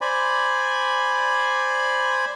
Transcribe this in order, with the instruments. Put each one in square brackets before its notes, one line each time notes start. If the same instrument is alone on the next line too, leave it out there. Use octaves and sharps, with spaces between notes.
[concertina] C5 D5 G#5 B5